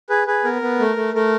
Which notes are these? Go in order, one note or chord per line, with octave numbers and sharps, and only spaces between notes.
G#4 B4
G#4 B4
B3 A#4
B3
A3
A3
A3 A#4